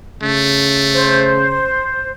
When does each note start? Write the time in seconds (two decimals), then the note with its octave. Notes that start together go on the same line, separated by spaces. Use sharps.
0.22 C#3 A3
0.92 C5